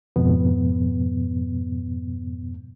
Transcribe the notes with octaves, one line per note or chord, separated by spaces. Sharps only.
F2 G#2 B2 B3